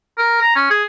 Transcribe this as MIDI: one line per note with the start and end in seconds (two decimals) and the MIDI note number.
0.18 0.41 70
0.42 0.53 82
0.56 0.69 61
0.71 0.84 68